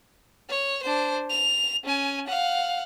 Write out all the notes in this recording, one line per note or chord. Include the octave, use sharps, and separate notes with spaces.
C#5
D4 C5
F7
C#4 G#5
F5 F#5